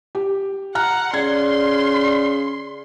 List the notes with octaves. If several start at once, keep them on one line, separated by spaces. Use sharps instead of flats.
G4
F#5 A#5 F6 F#6
C#3 D5 C6 G#6